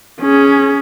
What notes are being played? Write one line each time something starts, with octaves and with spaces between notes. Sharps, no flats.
C#4 G#4